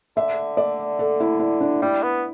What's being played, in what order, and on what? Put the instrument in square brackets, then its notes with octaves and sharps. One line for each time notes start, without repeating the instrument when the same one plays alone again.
[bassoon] D3 [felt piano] E5
[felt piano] D5
A4
E4
E4
D4
[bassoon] G3 [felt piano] E4
[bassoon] B3